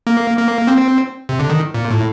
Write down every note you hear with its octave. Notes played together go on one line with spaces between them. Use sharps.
A#3
A#3
C4
C3
D3
D#3
A#2
A2